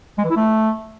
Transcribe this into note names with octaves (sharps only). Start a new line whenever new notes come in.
G#3
E3
E4
A3